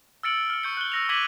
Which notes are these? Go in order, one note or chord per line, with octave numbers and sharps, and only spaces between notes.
E6 F6 A6 C#7 D7 F#7
F6 F#7
C#6 G6 C#7
F#6 G6 G7
E6 A#6 F7
C#6 D6 G#6 B6 D#7 F#7